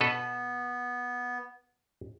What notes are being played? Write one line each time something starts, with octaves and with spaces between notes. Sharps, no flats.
B2 B3 A4 B4